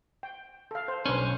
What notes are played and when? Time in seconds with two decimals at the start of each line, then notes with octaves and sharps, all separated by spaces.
0.23 G5
0.71 A4 F5
0.88 C5
1.06 B1 C#4 D4 B4 C5